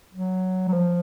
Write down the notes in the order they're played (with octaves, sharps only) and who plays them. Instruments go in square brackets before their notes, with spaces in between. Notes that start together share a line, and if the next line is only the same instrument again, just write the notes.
[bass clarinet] F#3
F#3
F3